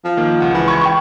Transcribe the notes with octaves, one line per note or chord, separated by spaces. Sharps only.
F3
D#3 A#3
C#2 F#5
E3
C#6 G#6
G5